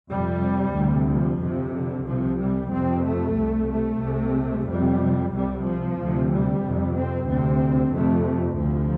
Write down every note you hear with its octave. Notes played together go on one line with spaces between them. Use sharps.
F2 C3 G3
D2 C3
F3
F2 C3
D3
C2 C3 F3
G3
F2 C3 C4
A3
C2 C3
A3
C2 C3
F2 C3 G3
C2 C3 G3
F3
D2 C3
G3
F2 C3
C4
D2 C3 C4
F2 C3 A3
D2 C3 F3